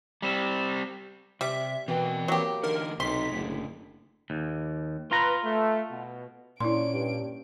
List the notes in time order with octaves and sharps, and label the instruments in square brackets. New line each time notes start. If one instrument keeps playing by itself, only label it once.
[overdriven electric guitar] G3 C4
[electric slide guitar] C3 [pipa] G3 [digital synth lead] E5
[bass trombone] B2 [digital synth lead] E3 [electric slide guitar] C4 A#4 G5
[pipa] F#3 G4 [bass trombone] A#3
[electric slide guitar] E2 D3 D#4 [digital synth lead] A#4
[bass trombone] B1 [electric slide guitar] C3 D#4 [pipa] C6 [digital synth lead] B6
[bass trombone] F#1 [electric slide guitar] A2 D3
[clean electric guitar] D#2
[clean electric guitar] F4 A#5 [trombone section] B4
[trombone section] A3
B2
[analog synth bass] A#2 [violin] C#4 D7 [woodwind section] D4 [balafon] E4 C6
[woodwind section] G2